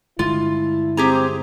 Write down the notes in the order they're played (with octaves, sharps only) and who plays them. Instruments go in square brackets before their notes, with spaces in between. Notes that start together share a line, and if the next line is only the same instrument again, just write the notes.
[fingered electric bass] G2 D3 G#3 [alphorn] E4 [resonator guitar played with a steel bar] F4
[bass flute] C4 [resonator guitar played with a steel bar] G4 G#4 A#5